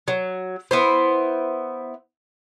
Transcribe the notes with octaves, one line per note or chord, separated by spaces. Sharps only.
F#3
B3 E4 C5